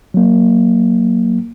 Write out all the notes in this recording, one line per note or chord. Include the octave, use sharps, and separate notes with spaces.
F#3 A#3